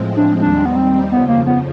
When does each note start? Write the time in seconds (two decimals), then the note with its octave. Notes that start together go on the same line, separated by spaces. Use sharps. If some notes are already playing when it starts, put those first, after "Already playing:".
Already playing: A2 F3 G#3 C4
0.17 D4
0.41 D#2 D#3 G3 C4 D4
0.65 B3
0.76 C4
1.12 F2 C#3 F3 B3
1.28 A#3
1.47 B3